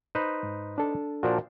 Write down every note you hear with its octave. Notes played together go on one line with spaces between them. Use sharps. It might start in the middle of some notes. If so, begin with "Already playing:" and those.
D#4 B4 C5
G#2
D4 A4
A#2 F3 D4 F#4 A#4